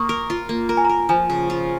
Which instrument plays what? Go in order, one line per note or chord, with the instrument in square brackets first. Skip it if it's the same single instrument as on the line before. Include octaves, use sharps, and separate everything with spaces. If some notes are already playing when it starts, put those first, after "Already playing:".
Already playing: [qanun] A#3 [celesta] C#6 D#6
[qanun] A#4
F4
A#3
[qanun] A#4 [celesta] A#5
[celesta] G#5
A#5
[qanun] A#4
[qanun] F3 [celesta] G#5
[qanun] C#3
F4